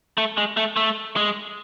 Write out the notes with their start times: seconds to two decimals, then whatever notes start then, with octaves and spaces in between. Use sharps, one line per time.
0.18 A3
0.37 G#3
0.57 A3
0.77 A3
1.16 G#3